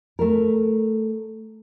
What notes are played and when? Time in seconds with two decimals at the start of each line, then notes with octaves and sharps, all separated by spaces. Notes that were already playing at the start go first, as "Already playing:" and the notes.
0.19 A3 A#4